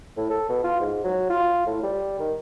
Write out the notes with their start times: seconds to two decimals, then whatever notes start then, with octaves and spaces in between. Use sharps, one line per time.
0.17 A2
0.30 A4
0.49 B2
0.64 F4
0.81 G#2
1.04 F#3
1.30 F4
1.66 A2
1.84 G3
2.20 D#3